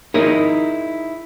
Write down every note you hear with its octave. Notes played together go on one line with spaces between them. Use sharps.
D#4 E4 G#4 A#4 D#5